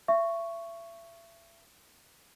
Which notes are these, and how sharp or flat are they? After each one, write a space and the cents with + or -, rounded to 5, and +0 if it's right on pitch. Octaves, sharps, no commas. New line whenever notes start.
E5 +35 C#6 +0